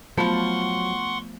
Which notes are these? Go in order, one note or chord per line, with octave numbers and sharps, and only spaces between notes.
F3 F#3 A3 B3 F4 F#5 C6 C#6